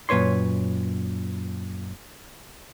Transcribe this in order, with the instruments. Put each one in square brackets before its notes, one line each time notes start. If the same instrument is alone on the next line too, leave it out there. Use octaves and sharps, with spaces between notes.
[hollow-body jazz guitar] F#2 A#2 B4 C#5 C6